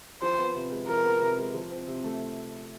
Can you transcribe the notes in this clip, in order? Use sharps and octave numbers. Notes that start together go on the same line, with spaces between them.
F3 C5
B3
C3
G#3
F3 A#4
B3
C3
G#3
F3
C4
C3
A3